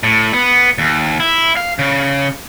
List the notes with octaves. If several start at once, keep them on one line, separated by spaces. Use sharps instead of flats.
A2
B3
D#2
E4
F5
C#3